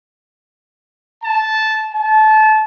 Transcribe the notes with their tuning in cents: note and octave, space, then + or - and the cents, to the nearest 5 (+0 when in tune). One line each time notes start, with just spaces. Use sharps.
A5 -10
A5 -25